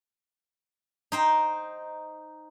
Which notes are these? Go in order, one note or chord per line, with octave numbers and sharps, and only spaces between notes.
D#4 C5 G5